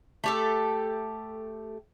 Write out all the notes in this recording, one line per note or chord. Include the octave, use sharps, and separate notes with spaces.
A3 G4 A4